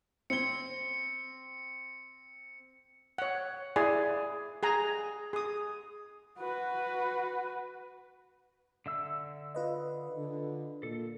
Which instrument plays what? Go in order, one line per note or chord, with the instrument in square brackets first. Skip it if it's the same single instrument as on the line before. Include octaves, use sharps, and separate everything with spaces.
[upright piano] C4 G7 [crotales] C#7
[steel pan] C#5 F#5
E4 G#4 D5 G#5
G#4 G#5 A#5
G#4 D#6
[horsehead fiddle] F#4 B4
[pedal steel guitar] D3 E5 E6
[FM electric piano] F4 B4 D#5
[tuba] D3
[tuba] A#2 [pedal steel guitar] A4